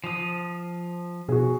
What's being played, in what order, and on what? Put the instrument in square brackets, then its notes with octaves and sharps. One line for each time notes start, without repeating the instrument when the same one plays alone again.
[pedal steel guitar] F3 D#6
[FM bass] B2 [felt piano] F#4 G#4